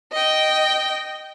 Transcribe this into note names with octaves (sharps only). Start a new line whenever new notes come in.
D#5 G5